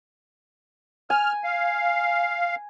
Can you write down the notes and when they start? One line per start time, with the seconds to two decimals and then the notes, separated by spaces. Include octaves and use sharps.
1.10 G#5 F6
1.44 F5